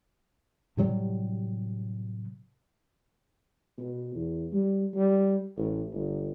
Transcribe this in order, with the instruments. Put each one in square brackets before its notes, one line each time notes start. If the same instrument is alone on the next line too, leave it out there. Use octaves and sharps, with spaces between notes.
[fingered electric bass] A2 C3 F#3 G3
[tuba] B2
E2
G3
G3
A1
G1